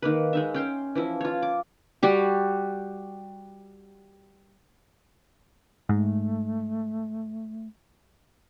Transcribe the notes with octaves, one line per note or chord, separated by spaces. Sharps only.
D#3 A#3 B4
G#3 D#4 E5
C#4 G5 C6
E3 F3 E4
F4 C#5
D6
G3 F#4 G4
G#2 A3